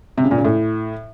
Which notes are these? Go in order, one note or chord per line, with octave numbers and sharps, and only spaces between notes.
C3
C#3
A#2
C#3
A2